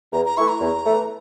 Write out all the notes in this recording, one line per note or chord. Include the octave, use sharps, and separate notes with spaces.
E2 A#5
A#5
E3 A3 E4 C#6
A#5
E2
E3 A3